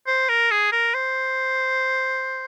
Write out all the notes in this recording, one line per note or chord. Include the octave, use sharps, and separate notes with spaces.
C5
A#4
G#4
A#4
C5